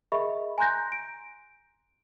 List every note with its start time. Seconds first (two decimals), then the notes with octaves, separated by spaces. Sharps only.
0.12 G#4 A#4 D#5 E5 B5 C#6
0.58 G#5 A#5 C6 F#6 G6 A#6
0.92 D7